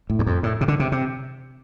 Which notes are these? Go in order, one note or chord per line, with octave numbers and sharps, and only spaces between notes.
A2
E2
F2
A2
C3
D3
C3
C3